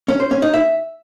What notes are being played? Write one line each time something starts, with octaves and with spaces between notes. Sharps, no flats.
C#4
C5
C#4
D#4
E5